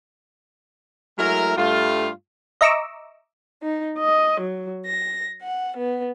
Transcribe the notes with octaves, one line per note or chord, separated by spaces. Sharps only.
F#3 G#3 A3 E4 A#4
G2 G3 A3 F4
D#5 E5 A#5 C#6 D6 E6
D#4
D#5
F#3
A#6
F#5
B3